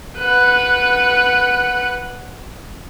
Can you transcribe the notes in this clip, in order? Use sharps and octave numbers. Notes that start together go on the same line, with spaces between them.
B4 F#5